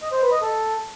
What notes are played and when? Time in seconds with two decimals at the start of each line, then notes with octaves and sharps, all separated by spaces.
0.02 D#5
0.12 C5
0.22 B4
0.32 D#5
0.41 A4